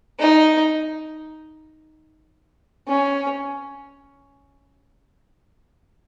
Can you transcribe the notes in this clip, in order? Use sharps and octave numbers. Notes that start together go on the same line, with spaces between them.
D#4
C#4